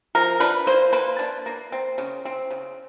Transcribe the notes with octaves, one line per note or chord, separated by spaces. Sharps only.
F3 A#4
D4 B4
A#3 C5
A#3 B4
D4
A#3
C4
C#3
C4
C#3